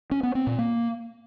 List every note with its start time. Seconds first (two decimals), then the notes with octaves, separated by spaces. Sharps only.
0.11 C#4
0.23 B3
0.35 C4
0.47 A#2
0.59 A#3